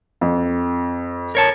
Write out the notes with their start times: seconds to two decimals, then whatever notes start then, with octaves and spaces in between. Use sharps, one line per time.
0.21 F2
1.35 A#4 C#5 A5